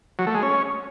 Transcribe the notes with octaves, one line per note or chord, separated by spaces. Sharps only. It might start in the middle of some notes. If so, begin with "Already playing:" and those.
F#3
A3
G#3
C#4